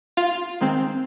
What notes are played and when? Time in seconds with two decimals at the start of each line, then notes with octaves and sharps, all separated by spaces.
0.17 F4 F5
0.61 D#3 G#3 C4